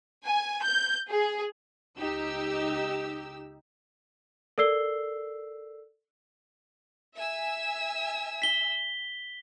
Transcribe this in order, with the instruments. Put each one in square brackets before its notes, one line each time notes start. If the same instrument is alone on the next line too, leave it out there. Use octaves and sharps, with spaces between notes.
[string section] G#5
G6
G#4
C#2 D#4 G4 E6
[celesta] A4 A#4 D5 E6 C7 G7
[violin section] E5 G#5 E6
[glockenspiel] B6 G7